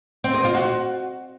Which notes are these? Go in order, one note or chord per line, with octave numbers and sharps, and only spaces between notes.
C4
D#5
F4
F#4